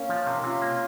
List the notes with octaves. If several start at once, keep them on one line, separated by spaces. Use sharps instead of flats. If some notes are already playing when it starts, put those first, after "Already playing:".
Already playing: A#3 C#4
F3
C3
D#4
C3 C#4 F4
A#3